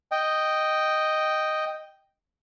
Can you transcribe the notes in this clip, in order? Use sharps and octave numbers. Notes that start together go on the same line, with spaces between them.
D#5 G5